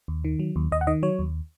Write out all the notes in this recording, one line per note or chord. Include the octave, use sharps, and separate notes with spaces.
D#2
D#3
F#3
D#2
D#2 D#5
F#5
D#3 D#5
F#3 C#5
D#2